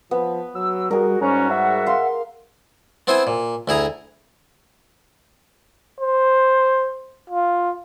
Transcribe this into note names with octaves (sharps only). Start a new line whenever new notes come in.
F3 B3
F#3 E6
G3 F#4 G#4 A#4
G#2 G3 C#4 F#4 A#5
E5 F#5
F5 C6
B3 C4 E4 C5 G#5
A#2
D2 E4 G#4 A#5
C5
F4